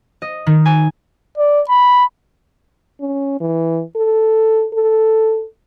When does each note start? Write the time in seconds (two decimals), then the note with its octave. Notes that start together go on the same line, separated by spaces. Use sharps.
0.22 D#5
0.46 D#3
0.66 G#5
1.38 D5
1.69 B5
3.01 C#4
3.41 E3
3.96 A4
4.73 A4